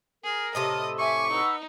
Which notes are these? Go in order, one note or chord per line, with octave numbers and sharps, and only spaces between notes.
G#4 A#4
A2 C3 A4 D#5 D#6
E5 G#5 C#6 D6
D#4 B4 F#5 E6